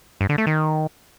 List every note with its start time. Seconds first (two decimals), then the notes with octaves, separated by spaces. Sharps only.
0.21 G2
0.29 D3
0.38 A3
0.47 D#3